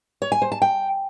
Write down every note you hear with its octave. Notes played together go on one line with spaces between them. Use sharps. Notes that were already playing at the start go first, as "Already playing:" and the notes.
C#5
G#5
C5
A5
G5